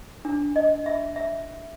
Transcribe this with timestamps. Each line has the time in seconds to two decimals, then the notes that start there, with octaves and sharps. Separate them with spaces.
0.25 D4
0.56 D#5
0.86 E5
1.16 E5